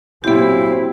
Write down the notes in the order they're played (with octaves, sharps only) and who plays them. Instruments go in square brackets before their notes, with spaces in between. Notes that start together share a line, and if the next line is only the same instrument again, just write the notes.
[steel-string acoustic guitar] F#2 A#2 [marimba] B3 G4 [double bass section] C4 [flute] E4